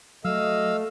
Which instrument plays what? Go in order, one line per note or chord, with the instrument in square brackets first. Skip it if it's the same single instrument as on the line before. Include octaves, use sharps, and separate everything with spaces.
[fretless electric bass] F#3 [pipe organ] A3 [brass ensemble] D#5 [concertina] F5 E6